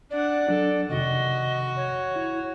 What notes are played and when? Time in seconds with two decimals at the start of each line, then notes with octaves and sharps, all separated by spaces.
0.11 D4 D5 F#5
0.49 F#3 D4 A4
0.89 F2 C3 D#3 F#4 D#5
1.76 C#5
2.16 E4